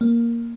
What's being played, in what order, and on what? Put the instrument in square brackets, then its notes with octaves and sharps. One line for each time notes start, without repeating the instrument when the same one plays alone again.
[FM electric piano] A#3